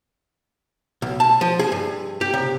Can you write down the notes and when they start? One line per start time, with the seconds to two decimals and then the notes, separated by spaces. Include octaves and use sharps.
1.02 B1
1.20 A5
1.41 F3
1.59 G#4
1.72 G2
2.21 G4
2.34 C3